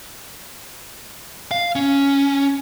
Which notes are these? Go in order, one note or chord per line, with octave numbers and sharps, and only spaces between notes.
F5
C#4